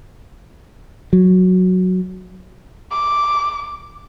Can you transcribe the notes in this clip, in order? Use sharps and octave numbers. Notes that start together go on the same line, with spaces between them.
F#3
D6